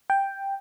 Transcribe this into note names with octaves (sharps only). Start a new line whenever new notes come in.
G5